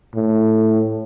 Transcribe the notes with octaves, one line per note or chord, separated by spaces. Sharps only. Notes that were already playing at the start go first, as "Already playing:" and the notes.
A2